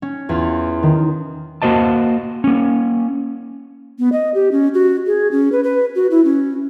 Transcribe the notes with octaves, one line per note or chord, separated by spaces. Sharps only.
C#4
E2 F4
D#3
A#3 F#4 C5 D#5 A5
A#3 C#4
B3
D#5
G4
C#4
F#4
G#4
C#4
B4
B4
F#4
E4
C#4